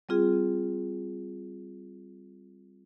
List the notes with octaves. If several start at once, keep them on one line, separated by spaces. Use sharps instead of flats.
G3 C4 F4 G#4